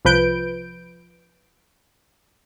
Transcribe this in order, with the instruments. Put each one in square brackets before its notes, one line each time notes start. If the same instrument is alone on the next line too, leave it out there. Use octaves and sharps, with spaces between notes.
[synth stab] C2 F3 B4 G6 D7